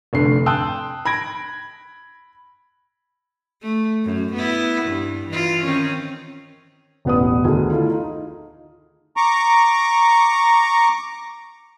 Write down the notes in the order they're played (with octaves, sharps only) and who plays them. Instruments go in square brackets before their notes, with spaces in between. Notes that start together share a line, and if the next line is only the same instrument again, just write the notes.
[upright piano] F1 D3 A3 C7
G5 A5 C6 D#6 E6 F#6
B5 G#6 A#6 D7
[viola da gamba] A3
F#2
B3 E4
G2
E3 F4
D#3 C4 C#4
[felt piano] E1 A1 B3 D5 D#6
D2 D3 D#3 G#4
A3 E4 F4
D#4 F4
[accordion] A#5 C#6 D6